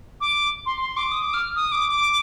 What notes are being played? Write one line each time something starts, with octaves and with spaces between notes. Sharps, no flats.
D6
C6
C6
D6
D#6
D6
F6
D#6
D6
D6
D6